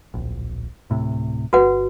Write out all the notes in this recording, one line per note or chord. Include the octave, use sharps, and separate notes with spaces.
D1 A#1
D1 A2 C3
G1 F#4 B4 F#5